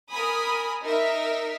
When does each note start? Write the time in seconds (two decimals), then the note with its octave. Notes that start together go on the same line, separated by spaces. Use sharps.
0.11 A#4 G#5 B5 D#6
0.84 D#4 A#4 E5